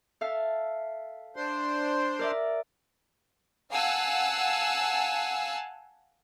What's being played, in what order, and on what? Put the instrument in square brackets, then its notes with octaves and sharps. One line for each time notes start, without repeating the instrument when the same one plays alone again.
[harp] A4 E5 F5
[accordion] D4 C5 C6
[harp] A#4 D5 E5
[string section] F5 F#5 G#5 A5 E6